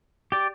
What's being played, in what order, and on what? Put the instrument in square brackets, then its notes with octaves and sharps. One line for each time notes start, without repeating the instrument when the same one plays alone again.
[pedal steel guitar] G4 D5